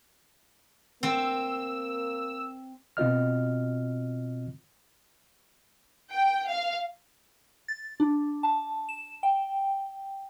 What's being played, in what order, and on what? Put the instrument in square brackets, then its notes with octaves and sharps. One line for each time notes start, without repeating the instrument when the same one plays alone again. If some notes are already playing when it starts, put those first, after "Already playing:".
[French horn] A#3 [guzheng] C4 [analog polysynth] E6
[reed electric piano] B2 C4 F4 D#5 F6
[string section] G5
F5
[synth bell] A6
D4
A5
E7
G5